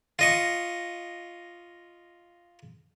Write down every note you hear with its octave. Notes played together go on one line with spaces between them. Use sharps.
F4 D#5 C#6